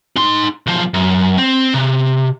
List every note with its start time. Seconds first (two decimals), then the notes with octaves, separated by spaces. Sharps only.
0.16 D#4 C6
0.67 B1 F3
0.94 F#2
1.38 C4
1.74 C3